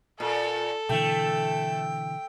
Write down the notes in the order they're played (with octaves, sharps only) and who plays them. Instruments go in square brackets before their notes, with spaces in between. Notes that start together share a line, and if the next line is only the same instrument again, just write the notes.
[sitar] A#2 [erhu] A4
[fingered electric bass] B2 D3 E3 [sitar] A3 [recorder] G5